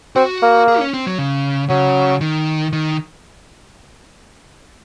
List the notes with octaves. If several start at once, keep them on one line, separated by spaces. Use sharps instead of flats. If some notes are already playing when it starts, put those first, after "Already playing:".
C4 F#4
A#3
G#4
C#4
C4
F#3
C#3
C#3 F#3
D#3
D#3